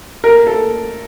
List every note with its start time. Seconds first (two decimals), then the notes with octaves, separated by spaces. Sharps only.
0.24 A#4
0.47 A4